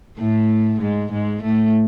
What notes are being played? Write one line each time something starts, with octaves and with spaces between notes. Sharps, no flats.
A2 A3
G#2 G#3
G#2 G#3
A2 A3